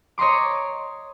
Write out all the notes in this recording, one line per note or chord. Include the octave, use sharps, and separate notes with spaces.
C#5 D#5 A#5 C6 D6